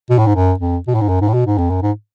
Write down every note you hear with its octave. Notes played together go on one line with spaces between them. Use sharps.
B2
A2
G#2
F#2
F2
B2
A2
G#2
F#2
G#2
A2
B2
G#2
F2
F#2
G#2